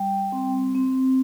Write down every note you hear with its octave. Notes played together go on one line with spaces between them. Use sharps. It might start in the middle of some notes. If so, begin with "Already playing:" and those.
Already playing: G3 G5
C4
C4